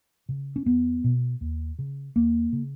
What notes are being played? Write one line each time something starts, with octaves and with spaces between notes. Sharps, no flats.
C#3
C#4
E2 B3
B2
D#2
C#3
D#2 A#3
C#3